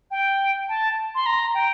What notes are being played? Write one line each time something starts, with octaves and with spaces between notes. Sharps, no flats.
G5
A5
C6
A#5
G5